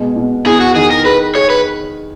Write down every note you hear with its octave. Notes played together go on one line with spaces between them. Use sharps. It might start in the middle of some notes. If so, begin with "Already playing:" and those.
Already playing: B2 G#3
B2
E2 G#4
F#4
D#3 G#4
A#4
G#4 B4
G#4 C#5
B4